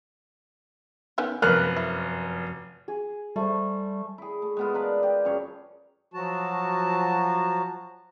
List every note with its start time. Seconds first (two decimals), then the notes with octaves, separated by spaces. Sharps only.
1.18 D#3 B3 C#4
1.42 F1 F#2 F3 A#3 A#4 B4 F6 F#6
1.76 E4 C#6
2.88 G#4
3.36 G3 A3 C5
4.18 E4 G#4
4.42 A3
4.57 G#3 B3 F4
4.74 D4 A#4 B4 D5
5.03 G4
5.25 F#2 C#3 G#4 C#5
6.14 F3 F#3 F#4 A5